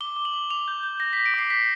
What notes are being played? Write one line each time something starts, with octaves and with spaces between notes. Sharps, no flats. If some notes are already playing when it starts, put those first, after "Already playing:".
D6 G7
D6
F#7
D6
D6 F7
G6
G6
G6 A#6
G6 B6
D7
D6 C7
G6 B6